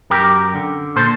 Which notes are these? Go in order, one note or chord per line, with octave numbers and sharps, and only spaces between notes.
F#2 G4 A#4
D3
A#2 A4 C5